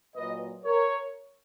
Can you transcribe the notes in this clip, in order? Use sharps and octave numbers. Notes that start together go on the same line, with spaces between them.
A#2 F#3 B4 D#5
A#4 C#5